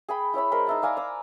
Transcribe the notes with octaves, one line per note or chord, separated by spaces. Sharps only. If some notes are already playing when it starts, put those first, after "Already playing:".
G#4 G5 B5
E4 C#5 E5 B5
G#3 A#4 C5 B5
D#4 E5 A5
D5 F5 G#5 A#5
D6 E6